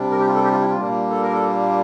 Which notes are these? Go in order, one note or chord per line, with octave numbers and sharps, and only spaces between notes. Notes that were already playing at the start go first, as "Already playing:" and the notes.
Already playing: C3 G3 D4
A#4
G4
F4
A4
G4
F4
E4
F4
A#2 G3 A#3 D4
A4
A#4
A4